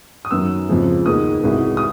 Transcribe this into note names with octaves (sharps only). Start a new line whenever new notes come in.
D#6
F#2 D#3 F#3 B3 E6
F2 C#3 F3 G#3
D#2 D#3 G#3 B3 D#6
C2 B2 G#3
D#6